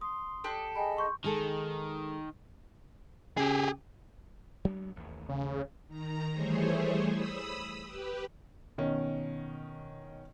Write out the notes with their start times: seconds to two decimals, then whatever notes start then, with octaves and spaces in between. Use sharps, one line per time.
0.01 C6 D#6
0.44 D4 G4 A4
0.75 G#4 D#5 G5 G#5 B5
0.97 C6 C#6 G6
1.24 D#3 G#3 G#4 A4
3.37 C#3 G4 G#4
4.65 F#3 G#3 D4
4.96 A1 D#2
5.29 C#3
5.87 D#3 A#5
6.32 E3 G3 A3 G#4 C5 C#5
7.11 B5 D#6 E6
7.84 G4 B4
8.78 B2 D#3 C#4